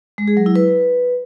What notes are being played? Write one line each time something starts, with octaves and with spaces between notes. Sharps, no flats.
G#3
G#4
F#3
E4
B4